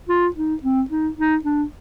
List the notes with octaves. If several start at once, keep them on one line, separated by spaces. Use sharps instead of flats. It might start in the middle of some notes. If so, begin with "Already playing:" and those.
F4
D#4
C4
D#4
D#4
D4